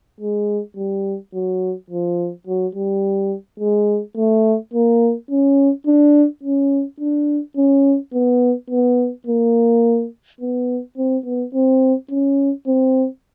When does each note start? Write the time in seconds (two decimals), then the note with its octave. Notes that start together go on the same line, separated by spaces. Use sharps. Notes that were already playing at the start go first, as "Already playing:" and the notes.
0.21 G#3
0.77 G3
1.34 F#3
1.90 F3
2.47 F#3
2.75 G3
3.60 G#3
4.17 A3
4.74 A#3
5.31 C#4
5.87 D4
6.43 C#4
7.00 D4
7.57 C#4
8.14 B3
8.70 B3
9.27 A#3
10.41 B3
10.98 C4
11.25 B3
11.54 C4
12.11 C#4
12.67 C4